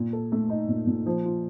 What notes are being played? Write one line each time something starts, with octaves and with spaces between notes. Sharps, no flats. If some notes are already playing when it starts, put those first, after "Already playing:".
Already playing: A#2
A4
A3
D#4
A#2
A#2
F3
F4